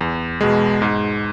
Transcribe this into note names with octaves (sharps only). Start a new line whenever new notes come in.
E2
B2 G#3
G#2